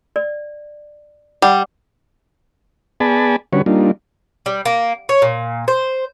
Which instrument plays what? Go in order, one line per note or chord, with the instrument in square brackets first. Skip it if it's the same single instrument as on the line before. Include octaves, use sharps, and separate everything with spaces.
[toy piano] D5
[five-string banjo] G3 [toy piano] F#5
[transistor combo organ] B3 G#4 D5 G#5 A5 B5
D3 G3 C#4 F#4 B4 C#5
G3 A#3 D4 D#4 F4
[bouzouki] G3
A#3
C#5
A#2
C5